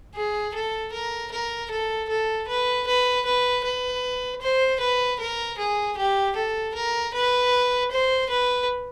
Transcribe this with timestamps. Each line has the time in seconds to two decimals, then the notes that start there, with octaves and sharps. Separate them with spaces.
0.15 G#4
0.54 A4
0.93 A#4
1.31 A#4
1.70 A4
2.09 A4
2.48 B4
2.87 B4
3.26 B4
3.64 B4
4.42 C5
4.80 B4
5.19 A#4
5.58 G#4
5.97 G4
6.36 A4
6.74 A#4
7.13 B4
7.91 C5
8.30 B4